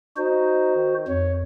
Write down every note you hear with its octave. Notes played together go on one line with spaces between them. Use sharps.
D#4 F#4 C5
D#3
F2 C#5